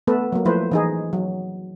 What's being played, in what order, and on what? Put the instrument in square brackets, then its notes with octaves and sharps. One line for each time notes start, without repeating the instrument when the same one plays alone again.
[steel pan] A3 B3 A4 B4
F#3 A#3
F3 A3 E4 B4 C5
E3 D#4 G#4
F#3